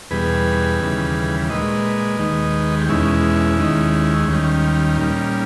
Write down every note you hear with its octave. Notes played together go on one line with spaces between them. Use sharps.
E2 B2 G3 G#4 B4
D#2 C#3 E3 G3
A#2 G#3 B4 D#5
D#2 D#3 G#3
G4
E2 B2 G#3 C#4 E4
D#2 D#3 G#3
D#2 D#3 G3 C#4
A#2 G3